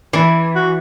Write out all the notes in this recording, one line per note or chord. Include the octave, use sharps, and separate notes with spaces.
E3 E4 B4 D5
F#4